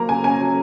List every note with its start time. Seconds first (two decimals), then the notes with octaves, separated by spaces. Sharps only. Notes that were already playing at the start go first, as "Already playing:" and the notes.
Already playing: F#3 A#3 A#5
0.08 C#3 G#5
0.24 C#4 G#5
0.40 F#3